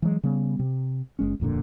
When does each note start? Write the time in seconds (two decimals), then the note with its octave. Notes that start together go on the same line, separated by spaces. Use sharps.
0.02 E3 F#3 G#3
0.23 C#3 G3 B3
0.59 C3
1.19 F#1 G#3 C#4
1.40 D1 F2 A#2 D3